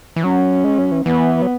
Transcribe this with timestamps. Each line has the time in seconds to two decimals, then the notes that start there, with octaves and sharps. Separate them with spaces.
0.16 E3
0.23 F#3 C#4
0.64 G#3
0.78 F#3
0.91 E3
1.06 E3 B3
1.42 F#3